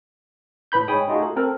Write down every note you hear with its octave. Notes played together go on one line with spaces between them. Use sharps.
A2 B4 B5 G6
G#2 G#4 C#5 G5 B5 D#6
A3 D#4 F4 F#4 G#4
A4
C4 A4 A#4